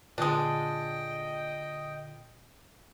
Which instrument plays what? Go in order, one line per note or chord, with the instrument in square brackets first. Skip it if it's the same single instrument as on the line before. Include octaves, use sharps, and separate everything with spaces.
[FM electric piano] A#2 D3 [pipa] G#3 D4 [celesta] F4 D#6 [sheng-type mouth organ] D#5 G5